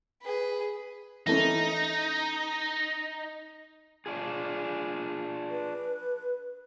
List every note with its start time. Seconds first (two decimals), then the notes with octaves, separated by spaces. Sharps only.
0.22 G#4 B4
1.27 E3 A3 C#4 D#4
4.06 D4 F4 G#4
5.50 B4